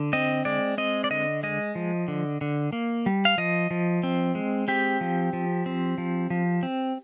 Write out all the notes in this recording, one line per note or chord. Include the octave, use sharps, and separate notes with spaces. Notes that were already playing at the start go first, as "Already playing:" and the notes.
Already playing: D3
C4 D#5
G#3 D5
C4 D#5
D5
D3 D#5
G#3 D#5
F3
D3
D3
A#3
G3
F5
F3 D#5
F3
C4
G#3
C4 G4
F3
F3
C4
F3
F3
C4